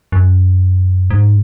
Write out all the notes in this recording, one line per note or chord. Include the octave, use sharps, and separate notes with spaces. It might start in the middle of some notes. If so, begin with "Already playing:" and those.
F#2
G#2